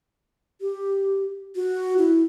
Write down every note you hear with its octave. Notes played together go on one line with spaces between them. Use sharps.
G4
F#4
E4